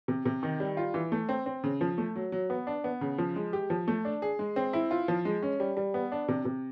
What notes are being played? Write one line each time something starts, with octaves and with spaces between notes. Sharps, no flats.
C3
C3
D#3
G3
F4
E3
A3
C4
C4
C#3
F3
A3
F#3
F#3
B3
D4
B3
C#3
F3
G#3
G4
F3
A3
D4
G#4
G#3
C4
E4
F4
F3
G#3
C#4
G3
G3
B3
D4
C3
C3